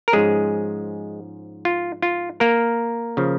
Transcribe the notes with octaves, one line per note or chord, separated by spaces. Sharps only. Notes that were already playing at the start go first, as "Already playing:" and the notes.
A#4
G#2 F3 G#3 C#4 G#4
F4
F4
A#3 A#4
C#3 F3